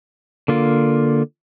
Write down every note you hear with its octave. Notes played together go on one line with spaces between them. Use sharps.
D3 A#3 F4